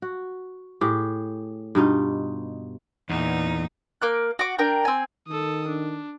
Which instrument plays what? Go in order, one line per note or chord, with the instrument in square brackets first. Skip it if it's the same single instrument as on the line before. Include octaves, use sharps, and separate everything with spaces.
[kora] F#4
A2 G4 G#4
G2 B2 D#4 F4
[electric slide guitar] E2 [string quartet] A#2 D#4
[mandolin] A#3 D6 F#6
F#4 D6
D4 A#4 G5
C4 G#5
[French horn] D#3 [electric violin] A4 D#6
[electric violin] D4